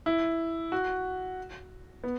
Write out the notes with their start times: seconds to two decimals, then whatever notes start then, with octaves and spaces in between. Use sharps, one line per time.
0.06 E4
0.72 F#4
2.04 B3